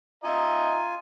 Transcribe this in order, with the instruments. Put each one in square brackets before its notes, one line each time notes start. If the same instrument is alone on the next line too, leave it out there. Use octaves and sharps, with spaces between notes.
[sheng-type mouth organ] F4 G#5 [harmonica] D#5 E5 A#5